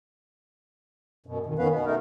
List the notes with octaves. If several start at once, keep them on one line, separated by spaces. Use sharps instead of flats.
F#2 B2
F2 D#3
D#3 B3 C#4 B4 F5
B2 B3
A3 D#4 A#4